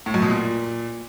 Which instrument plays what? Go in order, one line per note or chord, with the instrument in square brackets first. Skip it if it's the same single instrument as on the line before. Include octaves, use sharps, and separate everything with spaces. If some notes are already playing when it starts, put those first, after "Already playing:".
[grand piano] A2
F#2
B2
A#2